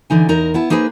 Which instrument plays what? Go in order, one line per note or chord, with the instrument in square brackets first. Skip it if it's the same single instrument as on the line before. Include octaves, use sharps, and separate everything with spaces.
[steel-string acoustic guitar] D3 E3 D#4 G#5
E2 D#4 A#4 A#5
B3 E4 A5
A#3 D#4 G#4 A4 B4 C5